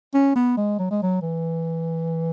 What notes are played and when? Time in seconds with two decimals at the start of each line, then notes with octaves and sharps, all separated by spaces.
0.14 C#4
0.35 B3
0.57 G#3
0.79 F#3
0.91 G#3
1.02 F#3
1.22 E3